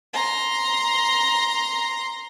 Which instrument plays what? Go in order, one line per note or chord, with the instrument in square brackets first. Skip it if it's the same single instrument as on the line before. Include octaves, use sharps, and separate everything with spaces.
[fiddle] A#5 C6